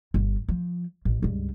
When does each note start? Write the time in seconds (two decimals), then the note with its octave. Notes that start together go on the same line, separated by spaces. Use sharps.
0.14 G1
0.49 F3
1.05 A1
1.23 C#2 G2